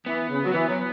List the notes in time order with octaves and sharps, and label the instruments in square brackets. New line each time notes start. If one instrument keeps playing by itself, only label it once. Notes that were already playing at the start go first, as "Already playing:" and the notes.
[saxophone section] E3 [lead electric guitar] B3
[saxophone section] C#3
F#3
[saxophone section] E3 [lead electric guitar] B3
[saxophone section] F#3